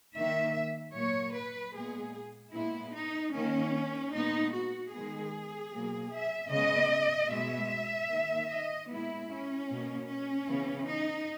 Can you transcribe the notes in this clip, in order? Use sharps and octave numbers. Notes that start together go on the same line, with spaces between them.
D#3 A#3 E5
A#2 F#3 A#3 C#5
B4
A#2 G#3 B3 G#4
A#2 G#3 B3 E4
D#4
D#3 A#3 C#4
A#2 G#3 B3 D#4
F#4
D#3 G#3 B3 G#4
B2 F#3 A#3
E5
C#3 G#3 B3 D#5
B2 G#3 B3 E5
D#3 A#3
D#5
A#2 G#3 B3 E4
C#4
B2 A#3
C#4
C#3 E3 B3
D#4